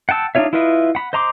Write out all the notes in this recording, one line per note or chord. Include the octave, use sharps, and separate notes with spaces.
F#5 G5 A5 E6
D4 D#4 F4 C#5 E5
E4 F4 B4 D#5 E5
F#5 B5
C5 D#5 A#5 C6 D6